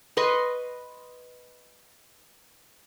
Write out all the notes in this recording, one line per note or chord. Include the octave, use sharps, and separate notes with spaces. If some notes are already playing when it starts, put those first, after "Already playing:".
B4 D#5 C6 C#6